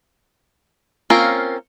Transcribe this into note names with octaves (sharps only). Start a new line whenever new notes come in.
A#3 C4 C#4 F4 A#4